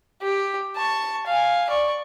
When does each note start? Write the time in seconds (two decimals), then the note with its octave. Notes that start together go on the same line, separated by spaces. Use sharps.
0.22 G4
0.76 A5 C#6
1.26 F5 G#5
1.69 D5 C#6